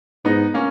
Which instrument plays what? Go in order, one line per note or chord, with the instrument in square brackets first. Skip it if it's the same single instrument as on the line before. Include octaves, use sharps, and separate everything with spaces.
[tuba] G#2 [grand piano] B3 D#4
[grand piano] A#3 C#4